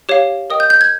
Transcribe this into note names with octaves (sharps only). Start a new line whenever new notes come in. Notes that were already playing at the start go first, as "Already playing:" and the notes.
G4 C#5 F5
A#4 D#5 G5 D#6
G6
G6
G#6